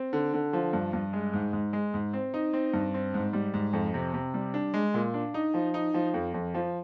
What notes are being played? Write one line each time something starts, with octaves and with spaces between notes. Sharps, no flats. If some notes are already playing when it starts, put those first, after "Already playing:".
Already playing: C4
D3
D3
F3
G2
G2
G#3
G#2
G#2
G#3
G#2
C4
D#4
C4
G2
C4
G#2
G3
G#2
F2
C3
C3
G3
D4
G#3
A#2
D4
D#4
F3
D#4
F3
F2
F2
F3